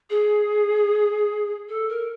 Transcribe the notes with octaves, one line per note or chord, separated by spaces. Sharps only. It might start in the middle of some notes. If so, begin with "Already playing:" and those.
G#4
A4
A#4